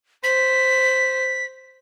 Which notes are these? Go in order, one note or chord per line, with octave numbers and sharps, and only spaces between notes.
C5 B6